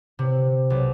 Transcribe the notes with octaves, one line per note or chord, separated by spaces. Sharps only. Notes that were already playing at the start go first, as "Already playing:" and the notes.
C3
B1